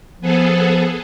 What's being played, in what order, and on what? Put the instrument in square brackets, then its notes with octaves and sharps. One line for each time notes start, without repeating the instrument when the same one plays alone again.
[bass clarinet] F3 [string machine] B3 G#4 A4